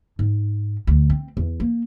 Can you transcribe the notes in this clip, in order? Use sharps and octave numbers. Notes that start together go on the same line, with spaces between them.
G#2
D2
C4
E2
A#3